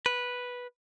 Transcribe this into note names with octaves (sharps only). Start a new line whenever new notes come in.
B4